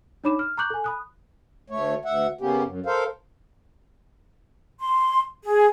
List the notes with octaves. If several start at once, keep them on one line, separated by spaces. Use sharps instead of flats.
D4 D#4 C#5 B5 D6 E7
F6
A#5 C#6 D6 F#6 G6 F#7
A4 G#5
B5 D#6 F#6
D2 A3 C#5
D2 E5 F#5
C#3 A#3 B3 C#4 G4
F#2
A4 A#4 C5 F5
C6
G#4